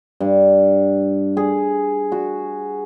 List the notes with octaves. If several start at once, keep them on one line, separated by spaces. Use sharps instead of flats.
G2
G#4
F#4